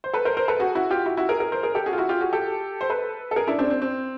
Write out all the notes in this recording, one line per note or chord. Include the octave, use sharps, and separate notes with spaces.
C5
A4 B4
A#4 C5
A#4 C5
A4 B4
F#4 G#4
E4 F#4
F4 G4
E4 F#4
E4 F#4
G#4 A#4
G#4 A#4
A#4 C5
G#4 A#4
G4 A4
F#4 G#4
F4
E4 F#4
F4 G4
F#4 G#4
G4 A4
C5
A4 B4
A4
G#4 A#4
D4 E4
C4 D4
C4
C4